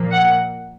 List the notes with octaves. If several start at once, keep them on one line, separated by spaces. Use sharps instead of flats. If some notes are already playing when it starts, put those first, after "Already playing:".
Already playing: A#2 F3 A#3
F#5